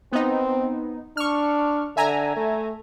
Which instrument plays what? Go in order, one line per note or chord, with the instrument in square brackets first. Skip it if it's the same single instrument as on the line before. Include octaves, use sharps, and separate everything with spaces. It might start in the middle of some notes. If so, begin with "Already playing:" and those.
[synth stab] B3 D#4 [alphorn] C4
[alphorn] D4 [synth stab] C#6 F6
[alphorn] D3 [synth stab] E5 G#5 A#5
[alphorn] A3